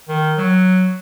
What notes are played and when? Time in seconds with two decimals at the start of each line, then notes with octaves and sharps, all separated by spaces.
0.08 D#3
0.38 F#3